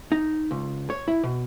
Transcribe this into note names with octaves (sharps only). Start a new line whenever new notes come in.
D#4
C#2
C#5
E4
B2